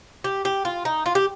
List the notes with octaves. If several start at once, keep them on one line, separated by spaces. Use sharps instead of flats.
G4
G4
F4
D#4
F4
G4